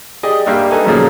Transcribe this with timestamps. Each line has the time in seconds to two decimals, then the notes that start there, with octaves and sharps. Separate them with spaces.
0.23 G4 G#4 D5 D#5
0.46 G2 G3 A#3 E5 F5 G5
0.70 D#4 A4 B4 G#5 A#5
0.84 A#2 C#3 F3 F#3 A3